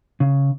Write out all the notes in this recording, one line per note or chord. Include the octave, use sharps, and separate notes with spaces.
C#3